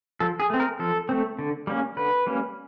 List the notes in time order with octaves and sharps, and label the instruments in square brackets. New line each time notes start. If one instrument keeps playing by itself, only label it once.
[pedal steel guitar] F3 A4
G#4
A3 C4
A#4
F3 A4
A3 C4
D3
G3 A#3 C#4
D3 B4
G3 A#3 C#4